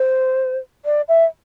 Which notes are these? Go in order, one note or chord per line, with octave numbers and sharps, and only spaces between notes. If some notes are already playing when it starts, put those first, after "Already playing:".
Already playing: C5
D5
E5